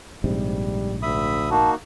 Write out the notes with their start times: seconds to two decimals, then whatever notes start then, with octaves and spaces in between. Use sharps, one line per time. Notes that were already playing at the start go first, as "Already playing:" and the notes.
0.24 A#1 G#2 C3 G3
1.02 D2 E5 B5 D#6
1.51 A#3 D#4 F#4 A5